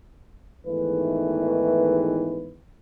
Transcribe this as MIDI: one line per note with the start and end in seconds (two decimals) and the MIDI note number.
0.67 2.59 40
0.67 2.59 44
0.67 2.59 51
0.67 2.59 52
0.67 2.59 57
0.67 2.59 71